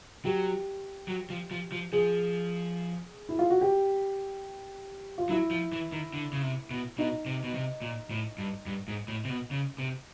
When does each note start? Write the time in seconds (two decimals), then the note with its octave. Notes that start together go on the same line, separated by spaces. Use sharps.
0.25 F#3 G4
1.08 F#3
1.30 F3
1.51 F3
1.72 F3
1.93 F3 G#4
3.29 E4
3.39 F4
3.50 F#4
3.61 G4
5.18 F4
5.29 F#3 E4
5.51 F3
5.72 E3
5.92 D#3
6.14 D3
6.33 C#3
6.43 C3
6.71 B2
6.98 B2 D#4
7.26 C3
7.44 B2
7.55 C3
7.82 A#2
8.11 A2
8.38 G2
8.66 G2
8.88 G#2
9.08 A2
9.25 C3
9.30 B2
9.51 C#3
9.78 C3